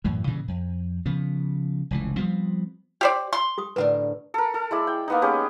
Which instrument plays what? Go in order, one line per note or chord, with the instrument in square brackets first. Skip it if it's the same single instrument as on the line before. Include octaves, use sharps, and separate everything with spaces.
[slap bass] F#2 A2 E3
G2 A#2 C#3 E3
F2
C#3 F3 B3
F1 C#2 E3
F3 G3 B3 C4
[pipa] G4 C5 D5
C6
[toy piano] G4 D#6
[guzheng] A2 D3 A#4 [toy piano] B4 F#5
[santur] A4 A#4
A4
G#3 E4 D5
G5
A#3 B3 D#4
G#3 B3 C#4 G4